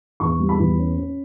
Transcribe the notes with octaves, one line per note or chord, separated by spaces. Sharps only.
E2 C#6
G3
B5
E2
C#4
C#4